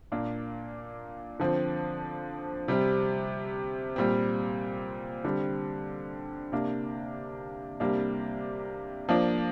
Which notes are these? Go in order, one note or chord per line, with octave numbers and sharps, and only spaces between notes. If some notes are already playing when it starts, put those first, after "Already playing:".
A#2 A#3 D4
D3 F3 C4
C3 G3 C4
A#2 G3 C4
D3 G3 C4
C3 A#3 D4
C3 G3 A#3 D4
F3 A#3 D4